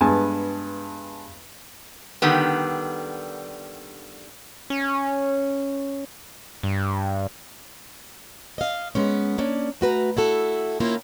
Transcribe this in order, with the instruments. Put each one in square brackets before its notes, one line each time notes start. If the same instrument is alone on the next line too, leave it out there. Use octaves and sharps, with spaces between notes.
[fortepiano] G2 G#3 B3 G#5 A5
[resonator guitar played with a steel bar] D3 D#3 G3 B3
[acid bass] C#4
G2
[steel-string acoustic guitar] D#5 F5
G#3 B3 C#4
A#3 C#4 D4
A3 F#4 B4 A#5
E4 F#4 A4
D#3 A#3 C#4 E4 F4